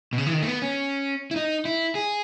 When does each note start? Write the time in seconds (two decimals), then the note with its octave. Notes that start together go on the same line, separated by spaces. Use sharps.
0.13 B2
0.18 C#3
0.27 E3
0.33 D#3
0.42 A3
0.48 B3
0.62 C#4
1.31 E4
1.36 D#4
1.65 E4
1.95 G#4